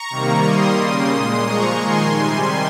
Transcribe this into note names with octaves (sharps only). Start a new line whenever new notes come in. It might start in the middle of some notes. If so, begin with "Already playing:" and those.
Already playing: A#5 C#6
C3 D#3 G3 A#3
D#3 G3 A#3 C6 D#6
C#3 G3 A#3
A#2 G#3
A#2 F3 G#3 A#5 C#6
D#3 G#3 G#5 C6
C3 D#3 G3